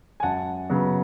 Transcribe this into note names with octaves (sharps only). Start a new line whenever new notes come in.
G#5
F#2 F#5 A5
C#3 F#3 B3